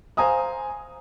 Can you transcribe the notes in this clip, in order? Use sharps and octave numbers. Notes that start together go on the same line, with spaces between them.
C5 F5 G#5 A#5 D#6